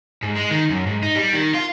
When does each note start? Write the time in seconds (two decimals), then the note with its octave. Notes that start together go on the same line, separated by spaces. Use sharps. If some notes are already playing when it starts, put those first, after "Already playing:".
0.23 G#2
0.36 G#3
0.51 D#3
0.71 F#2
0.87 G#2
1.03 D#4
1.16 G3
1.34 D#3
1.55 F4